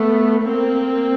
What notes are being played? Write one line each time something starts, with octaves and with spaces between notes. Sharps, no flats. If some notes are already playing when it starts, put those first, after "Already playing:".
Already playing: A3 B3
A#3 C4